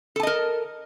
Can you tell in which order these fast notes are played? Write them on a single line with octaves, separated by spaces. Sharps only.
A4 A5 D#5 A#4